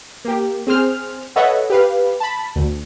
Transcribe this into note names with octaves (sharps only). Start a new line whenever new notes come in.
A#3 G4
C4 G#4 C5 F6
A4 B4 C#5 D#5 E5 F#5
G4 B4 F5
A5 B5
D2